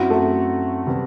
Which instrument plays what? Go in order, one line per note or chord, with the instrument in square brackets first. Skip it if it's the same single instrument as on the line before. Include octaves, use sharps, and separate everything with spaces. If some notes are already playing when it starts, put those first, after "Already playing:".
Already playing: [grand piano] F#2 F#3 C4 E4 [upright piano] F#4
[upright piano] A3
[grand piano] C3 G3 B3